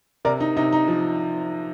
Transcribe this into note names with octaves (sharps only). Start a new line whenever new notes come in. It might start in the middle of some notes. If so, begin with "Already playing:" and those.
C3 A#4 D5
D#4
C3 D#4
D#4
F3